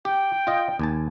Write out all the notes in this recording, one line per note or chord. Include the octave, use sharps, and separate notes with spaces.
G4 G5
F4 D#5
D#2 G#5 A5